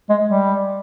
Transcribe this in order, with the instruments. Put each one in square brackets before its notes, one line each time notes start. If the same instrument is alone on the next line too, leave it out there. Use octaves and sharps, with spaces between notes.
[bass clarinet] G#3
G3